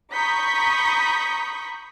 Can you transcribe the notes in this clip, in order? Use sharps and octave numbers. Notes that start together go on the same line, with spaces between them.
A#5 B5 C#6 D#6 G6 B6